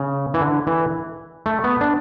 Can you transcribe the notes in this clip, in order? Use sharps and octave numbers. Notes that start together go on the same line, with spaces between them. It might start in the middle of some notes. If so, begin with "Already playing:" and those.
Already playing: C#3
E3
D3
E3
A3
B3
D4